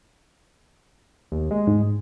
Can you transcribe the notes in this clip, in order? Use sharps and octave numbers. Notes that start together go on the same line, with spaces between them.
D#2
G#3
G#2